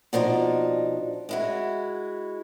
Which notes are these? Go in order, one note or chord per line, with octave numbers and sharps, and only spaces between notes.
B2 F3 D4 D#4
G#3 E4 F#4